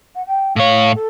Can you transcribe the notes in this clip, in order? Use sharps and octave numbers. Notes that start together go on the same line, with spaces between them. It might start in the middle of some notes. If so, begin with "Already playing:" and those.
F#5
G5
A2 C#5 F5
A4